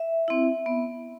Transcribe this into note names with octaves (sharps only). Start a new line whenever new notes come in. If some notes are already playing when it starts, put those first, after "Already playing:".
Already playing: E5
C4 E4
B3